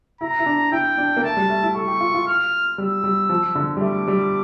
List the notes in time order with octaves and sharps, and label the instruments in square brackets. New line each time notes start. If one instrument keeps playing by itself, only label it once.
[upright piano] E4 [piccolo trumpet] A#5
[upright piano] E4
D4
[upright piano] E4 [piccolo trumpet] G5
[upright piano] D4
A#3
[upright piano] A3 [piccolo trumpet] A5
[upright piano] G3
A3
E4
[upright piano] A4 [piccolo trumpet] C#6
[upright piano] G4
F4
F4
[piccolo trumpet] F6
[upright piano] G3 [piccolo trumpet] E6
[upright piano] G3
F3
D3
G3
[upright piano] A3 [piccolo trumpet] D6
[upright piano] G3